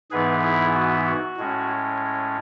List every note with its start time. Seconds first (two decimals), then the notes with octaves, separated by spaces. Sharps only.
0.11 G#2 E3 B3 G#4 B4
0.43 E4 G#4
0.74 F#4
1.06 F#4
1.37 A2 G#3 C#4